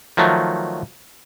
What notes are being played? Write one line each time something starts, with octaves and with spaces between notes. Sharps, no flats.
D#3 F3 F#3 A3